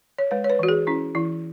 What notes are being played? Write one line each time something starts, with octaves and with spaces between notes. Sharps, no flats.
C#5
G#3 B4
C#5
B4
E3 F#4
G#4
C#4 E4
E3 E4